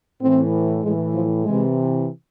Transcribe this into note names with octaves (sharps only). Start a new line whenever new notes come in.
A2 E3 C4
A2 E3 G#3
F3
C3 E3 G#3